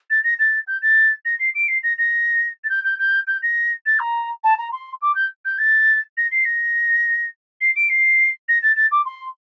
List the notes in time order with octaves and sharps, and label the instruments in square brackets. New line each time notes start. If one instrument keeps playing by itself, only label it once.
[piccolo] A6
A#6
A6
G6
A6
A#6
C7
D7
C7
A#6
A#6
A6
G6
G6
G6
G6
A#6
A6
A#5
A5
A#5
C6
D6
G6
G6
A6
A#6
C7
A#6
C7
D7
C7
A#6
A6
A6
D6
C6